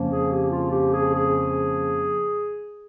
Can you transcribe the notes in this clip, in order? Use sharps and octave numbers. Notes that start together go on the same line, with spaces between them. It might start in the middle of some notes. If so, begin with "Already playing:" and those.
Already playing: F2 C#3 F3 A#3 C#4
G#4
G4
F4
G4
G#4
G#4